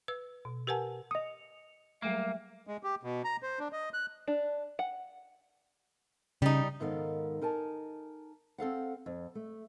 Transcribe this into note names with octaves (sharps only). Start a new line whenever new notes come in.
B4 E6
B2
G4 A#4 B4 F#5 G#5 A5
D#5 D#6 C#7 F7
F#3 G3 A3 A#3 E5
G#3
G4
B2
A#5
C5
D4
D#5
F#6
D4
F#5
C#3 G3 D#4
G#2 D#3 B3 A4 A#4 F5
D#4 A#4 G#5 A5
C4 A4 F5 F#5
F2
A3